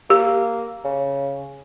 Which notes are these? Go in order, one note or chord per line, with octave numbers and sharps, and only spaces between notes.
A#3 G4
C#3